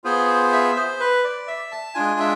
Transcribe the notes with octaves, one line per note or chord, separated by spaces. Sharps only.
B3 F4 G#4 C5
E5
C5
B4
D5
E5
A5
G#3 D4 F4 G#5
E5